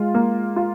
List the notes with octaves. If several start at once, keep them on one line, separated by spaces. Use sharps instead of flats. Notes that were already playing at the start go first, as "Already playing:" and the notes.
Already playing: G#3 F4
A#3
F4